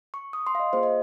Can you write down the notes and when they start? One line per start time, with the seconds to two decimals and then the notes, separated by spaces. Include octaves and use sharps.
0.14 C#6
0.33 D#6
0.47 C6
0.55 F5
0.60 D#5
0.73 A#3 F4 G#4 C5
0.83 D#5